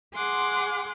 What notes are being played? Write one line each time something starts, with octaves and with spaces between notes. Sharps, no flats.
G#4 F#5 C6 D6